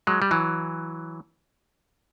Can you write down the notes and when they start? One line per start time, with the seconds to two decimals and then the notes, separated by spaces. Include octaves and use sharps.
0.07 F#3 G#3
0.22 G3
0.31 E3 F#3